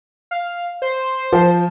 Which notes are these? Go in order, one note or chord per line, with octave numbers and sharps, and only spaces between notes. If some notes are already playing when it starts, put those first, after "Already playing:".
F5
C5
F3